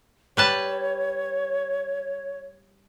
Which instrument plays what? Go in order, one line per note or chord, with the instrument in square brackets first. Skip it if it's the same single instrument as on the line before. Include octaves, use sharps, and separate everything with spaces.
[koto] G3 B4 A5 [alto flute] C#5